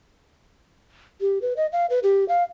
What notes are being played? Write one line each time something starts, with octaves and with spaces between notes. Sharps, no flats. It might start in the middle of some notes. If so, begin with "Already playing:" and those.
G4
B4
D#5
F5
B4
G4
F5